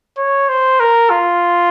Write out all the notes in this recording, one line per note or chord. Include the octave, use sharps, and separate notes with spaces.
C#5
C5
A#4
F4